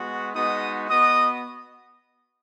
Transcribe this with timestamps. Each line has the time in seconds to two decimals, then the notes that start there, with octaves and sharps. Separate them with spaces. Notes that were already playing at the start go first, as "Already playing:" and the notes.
Already playing: G#3 B3 F#4
0.34 G#3 B3 D#4 F#4 D#5 D#6
0.89 B3 F#4 D#5 D#6